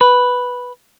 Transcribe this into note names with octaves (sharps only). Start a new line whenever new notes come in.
B4